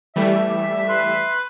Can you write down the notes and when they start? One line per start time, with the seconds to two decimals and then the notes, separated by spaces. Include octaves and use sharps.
0.16 E3 G3 A3 E5
0.48 G4
0.89 B4 C6